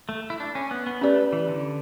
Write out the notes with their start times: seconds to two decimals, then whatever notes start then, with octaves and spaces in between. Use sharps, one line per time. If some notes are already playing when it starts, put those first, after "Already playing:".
0.09 A3
0.30 E4
0.40 D4
0.55 C#4
0.71 B3
0.87 B3
1.01 A3 C#4 G4 B4 D5
1.33 E3
1.48 D3